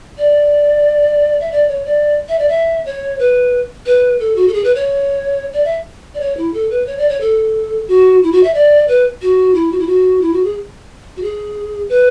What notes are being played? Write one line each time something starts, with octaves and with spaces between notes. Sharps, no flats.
D5
E5
D5
C#5
D5
E5
D5
E5
C#5
B4
B4
A4
F#4
A4
G#4
B4
C#5
D5
E5
D5
C#5
E4
A4
B4
C#5
D5
C#5
A4
F#4
E4
F#4
E5
D5
B4
F#4
E4
F#4
E4
F#4
E4
F#4
G#4
F#4
G#4
B4